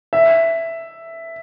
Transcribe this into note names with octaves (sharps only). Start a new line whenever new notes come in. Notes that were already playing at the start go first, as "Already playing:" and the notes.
E5